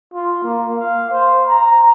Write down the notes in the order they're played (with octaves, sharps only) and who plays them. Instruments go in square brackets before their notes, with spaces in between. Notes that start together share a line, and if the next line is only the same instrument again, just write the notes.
[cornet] F4
A#3
F5
C5
A#5